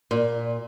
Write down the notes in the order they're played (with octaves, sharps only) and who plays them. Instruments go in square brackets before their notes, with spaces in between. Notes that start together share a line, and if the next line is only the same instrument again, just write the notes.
[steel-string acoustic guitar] A#2